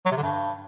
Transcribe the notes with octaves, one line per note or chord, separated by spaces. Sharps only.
F#3
C3
D3
G2